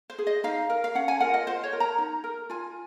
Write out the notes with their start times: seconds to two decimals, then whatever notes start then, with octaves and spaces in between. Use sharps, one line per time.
0.10 C5
0.18 G#4
0.27 D#5
0.44 D#4 F5
0.70 A#4
0.84 F5
0.95 C#4 F#5
1.08 G#5
1.20 F4 A#4 F#5
1.34 D#5
1.47 F4 C5
1.63 C#5
1.73 A#4
1.80 A#5
1.98 D#4
2.24 A#4
2.50 F4 G#5